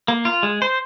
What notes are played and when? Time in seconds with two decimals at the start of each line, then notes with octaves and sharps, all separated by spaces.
0.08 A#3
0.25 F4
0.43 G#3
0.62 C5